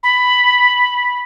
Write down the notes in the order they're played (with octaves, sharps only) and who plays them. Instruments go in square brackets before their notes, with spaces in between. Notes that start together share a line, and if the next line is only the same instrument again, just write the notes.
[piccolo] B5